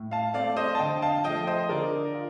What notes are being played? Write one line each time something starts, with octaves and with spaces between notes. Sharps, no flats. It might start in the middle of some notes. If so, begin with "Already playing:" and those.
Already playing: A2
F5 A5
A3 C4 D5 F5
C5 D#5
A5
D3 D#5 G5
F5 A5
F3 A3 D#5 G5
C5 D#5
D3 A#4 D5
F4